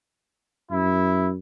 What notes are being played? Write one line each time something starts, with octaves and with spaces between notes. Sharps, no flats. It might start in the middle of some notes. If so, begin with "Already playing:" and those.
F#2 E4